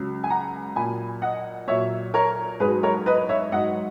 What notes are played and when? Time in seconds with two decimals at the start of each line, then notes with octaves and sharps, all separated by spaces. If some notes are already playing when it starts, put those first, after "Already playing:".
Already playing: C#2 C#3 F#3
0.24 G#5
0.30 F#5 A#5
0.76 A#2 F#3 G#5 B5
1.22 D#5 F#5
1.68 A#2 F#3 C#5 E5
2.14 A#4 C#5
2.60 G#2 G#4 B4
2.65 F#3
2.83 A#4 C#5
3.06 B4 D#5
3.29 C#5 E5
3.52 G#2 F#3 D#5 F#5